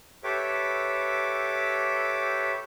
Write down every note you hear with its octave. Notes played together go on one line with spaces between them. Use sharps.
G4 A4 B4 C#5 E5 D6